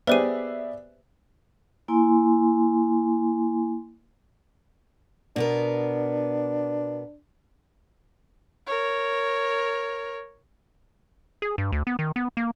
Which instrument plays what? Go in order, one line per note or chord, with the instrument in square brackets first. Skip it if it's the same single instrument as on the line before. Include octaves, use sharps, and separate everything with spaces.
[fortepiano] B3 G4 G#4 [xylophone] B4 C5 D#7 [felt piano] D5 E5
[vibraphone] A#3 E4 G#5 C6
[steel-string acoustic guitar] B2 B3 A#4 [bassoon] D4
[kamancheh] A#4 C#5
[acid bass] G#4
G2
D2
B3
D#3
B3
A#3